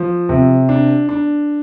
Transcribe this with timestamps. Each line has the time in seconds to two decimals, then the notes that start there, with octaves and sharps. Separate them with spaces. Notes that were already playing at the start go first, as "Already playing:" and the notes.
Already playing: F3
0.29 C3
0.69 D4
1.09 D4